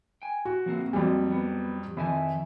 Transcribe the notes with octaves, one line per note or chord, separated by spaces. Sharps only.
G5 G#5
F#4
F3 A#3 C4
F2 F#3 G3
B3
F2 D#3 E5 G#5